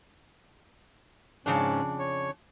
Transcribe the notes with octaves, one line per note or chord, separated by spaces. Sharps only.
F2 G#2 C#3 C#4 D4
C#5